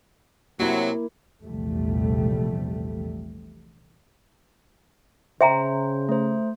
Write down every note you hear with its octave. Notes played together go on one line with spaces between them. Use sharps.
C3 F#3 A#3 E4
A#1 E2 C3 F3 G3 A3
C#3 C5 E5 G5 A#5
A3 C5